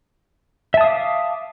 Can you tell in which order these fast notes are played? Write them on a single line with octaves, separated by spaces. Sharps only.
E5 A5 D#6 F5 D6